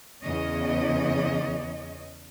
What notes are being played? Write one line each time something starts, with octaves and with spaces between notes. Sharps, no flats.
E2 C#3 C#5 D#5